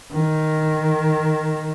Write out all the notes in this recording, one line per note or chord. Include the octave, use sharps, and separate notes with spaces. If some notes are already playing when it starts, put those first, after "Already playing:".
D#3